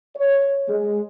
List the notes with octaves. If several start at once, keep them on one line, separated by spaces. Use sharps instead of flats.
C#5
G#3